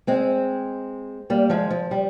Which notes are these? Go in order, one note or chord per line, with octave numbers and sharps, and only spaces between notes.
G#3 C4
G3 A#3
F3 G#3
F3
G3